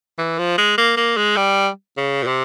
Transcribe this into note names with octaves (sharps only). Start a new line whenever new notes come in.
E3
F3
G#3
A#3
A#3
G#3
G3
C#3
A#2
C3